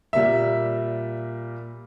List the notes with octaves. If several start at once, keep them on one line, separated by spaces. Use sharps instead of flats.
A#2 G3 A#3 E5